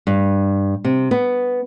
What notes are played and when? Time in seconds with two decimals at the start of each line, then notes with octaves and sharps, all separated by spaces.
0.07 G2
0.85 C3
1.11 B3